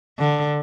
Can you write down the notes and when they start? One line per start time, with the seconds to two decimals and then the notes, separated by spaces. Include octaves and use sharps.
0.19 D3